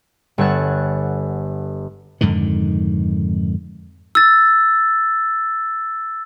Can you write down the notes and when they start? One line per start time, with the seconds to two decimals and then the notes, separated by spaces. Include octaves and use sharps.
0.38 G1 A4 C#5 F#5 F#6 A6
2.21 F2 G#2 D3 D#3
4.15 E6 A6